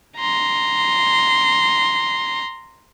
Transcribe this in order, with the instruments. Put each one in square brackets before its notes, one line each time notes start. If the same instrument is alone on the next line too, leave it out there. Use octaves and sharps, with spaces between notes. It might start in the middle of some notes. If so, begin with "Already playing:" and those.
[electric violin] A#5 C6